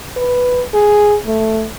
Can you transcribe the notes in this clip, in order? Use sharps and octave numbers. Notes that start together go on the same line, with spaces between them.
B4
G#4
A3